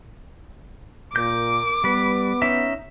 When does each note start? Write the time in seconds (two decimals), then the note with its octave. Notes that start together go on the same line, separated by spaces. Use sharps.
1.16 A#2 A#4 D6 G6
1.84 G3 B3 B4
2.42 C#4 D#4 E5